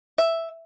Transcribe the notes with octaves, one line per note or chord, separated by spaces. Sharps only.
E5